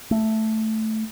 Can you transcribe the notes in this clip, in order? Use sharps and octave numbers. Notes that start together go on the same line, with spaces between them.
A3